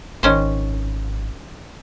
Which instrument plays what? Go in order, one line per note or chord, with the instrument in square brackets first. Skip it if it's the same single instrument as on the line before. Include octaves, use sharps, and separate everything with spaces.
[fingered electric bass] G#1 [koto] D#3 C#4 C5